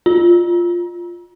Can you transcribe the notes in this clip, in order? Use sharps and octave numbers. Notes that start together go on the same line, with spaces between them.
F4